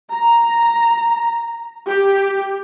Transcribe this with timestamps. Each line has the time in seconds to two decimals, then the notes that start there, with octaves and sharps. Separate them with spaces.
0.12 A#5
1.88 G4